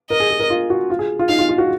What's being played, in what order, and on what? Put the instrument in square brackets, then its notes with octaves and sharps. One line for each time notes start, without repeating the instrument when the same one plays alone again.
[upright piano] A#4 [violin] D#5
[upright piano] G#4
G#4
A#4
F4
F#4
F4
G#4
F4
[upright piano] D#4 [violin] F5
[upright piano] F4
F4
F#4